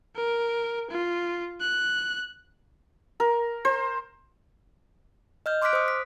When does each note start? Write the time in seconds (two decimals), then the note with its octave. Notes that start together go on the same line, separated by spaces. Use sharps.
0.16 A#4
0.90 F4
1.60 F#6
3.20 A#4
3.65 C5
5.46 D#5 F6 G6
5.62 C6 D6 F6 F#6 B6 D7
5.73 C5 D#6
5.88 B6